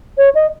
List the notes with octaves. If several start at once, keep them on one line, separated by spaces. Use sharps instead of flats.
C#5
D#5